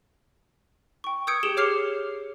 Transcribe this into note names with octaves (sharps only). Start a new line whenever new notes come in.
G5 C#6
D#6 E6 G6 G#6 C#7 D7
G4 G#4 E7 G7
C#5 D6 F6 C7 C#7 F7